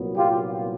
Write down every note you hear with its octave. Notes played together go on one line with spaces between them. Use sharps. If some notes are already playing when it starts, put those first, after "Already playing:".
Already playing: C2 A#2 F#3 B3
F4 G4